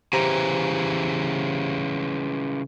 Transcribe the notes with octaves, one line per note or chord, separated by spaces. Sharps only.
C#3 E3 G4 C5 A#5